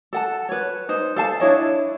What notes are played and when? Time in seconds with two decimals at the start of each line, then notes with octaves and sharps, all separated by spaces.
0.13 A4 F#5 A5
0.49 B4 C#5
0.89 D#4 C5
1.16 A4 F5 A5
1.40 D4 E4 C#5 D#5